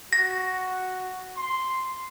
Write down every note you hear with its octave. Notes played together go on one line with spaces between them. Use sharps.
F#4 A#6
C6